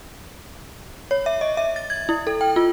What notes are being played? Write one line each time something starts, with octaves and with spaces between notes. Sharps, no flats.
C#5
E5
D#5
E5
A6
G#6
E4
A4
G5
F4